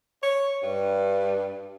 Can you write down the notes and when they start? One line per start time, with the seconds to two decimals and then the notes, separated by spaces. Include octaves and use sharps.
0.23 C#5
0.63 G2